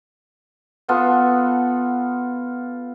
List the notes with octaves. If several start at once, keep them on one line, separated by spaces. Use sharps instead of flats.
B3 F4 A4 F#5